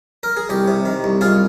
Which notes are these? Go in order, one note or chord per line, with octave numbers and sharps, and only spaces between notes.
A#4
G#4
C2 G4
C3
D#3
C2
C2 F4 G#4